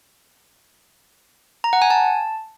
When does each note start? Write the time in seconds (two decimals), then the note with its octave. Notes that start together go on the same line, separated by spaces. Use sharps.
1.64 A#5
1.73 F#5
1.82 G#5
1.90 A5